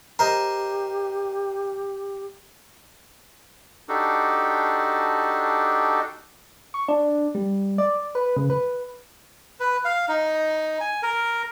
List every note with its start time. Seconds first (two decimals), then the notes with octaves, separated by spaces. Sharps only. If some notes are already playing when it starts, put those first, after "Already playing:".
0.19 G4 A#4 C5 D#5 A#5
3.89 D4 D#4 F#4 G4 A4
6.74 C#6
6.88 D4
7.35 G3
7.78 D5
8.15 B4
8.37 C#3
8.50 B4
9.60 B4
9.85 F5
10.08 D#4
10.81 G#5
11.03 A#4